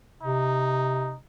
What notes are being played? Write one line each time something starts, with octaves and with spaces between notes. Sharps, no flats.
C3 D#4